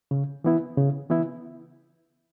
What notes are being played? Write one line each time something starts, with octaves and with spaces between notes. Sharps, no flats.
C#3
E3 B3 E4
C#3
E3 B3 E4